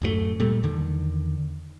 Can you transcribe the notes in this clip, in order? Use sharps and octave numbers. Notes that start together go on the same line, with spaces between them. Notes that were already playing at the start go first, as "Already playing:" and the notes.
D1 F#2 F3 A3
A#2 G3 A3
E2 D3 D#3